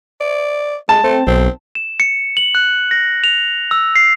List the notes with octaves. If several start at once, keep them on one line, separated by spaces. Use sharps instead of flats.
D5
G#3 A5
A3 C4
B1 C4
E7
C#7
F#7
F#6
A#6
F7
E6
C7